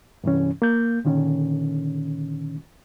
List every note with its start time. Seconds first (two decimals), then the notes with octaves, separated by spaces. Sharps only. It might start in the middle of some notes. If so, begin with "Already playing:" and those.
0.24 G2 C3 E3 C#4
0.62 A#3 G6
1.05 A#2 D3 D#3 C#4